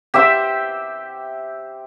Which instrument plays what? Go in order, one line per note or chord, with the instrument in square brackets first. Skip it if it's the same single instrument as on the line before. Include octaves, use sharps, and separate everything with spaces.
[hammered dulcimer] G4 C5 E5 G5